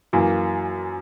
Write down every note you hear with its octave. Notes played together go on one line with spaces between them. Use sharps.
F#2 E3 A#3